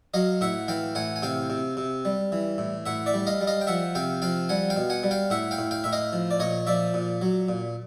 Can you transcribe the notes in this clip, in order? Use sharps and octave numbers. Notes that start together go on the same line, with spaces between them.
F#3 D#5 F5
A2 E5 F#5
E3 F5 G5
A2 F#5 G#5
G#5
C3 F5 G5
C3
C3
G3
E3
A2
A2 E5 F#5
D5 E5
G3
D#5 F5
G3
D#5 F5
G5
F3 E5 F#5
C3 F5 G5
F3 F5 G5
G3 F#5 G#5
F5 G5
B2
F#5 G#5
G3
F5 G5
A2 E5 F#5
F5 G5
A2
F5 G5
A2 E5
D#5 F5
F3
D5
A#2 C#5 D#5
F3 D5 E5
A#2
F#3
A#2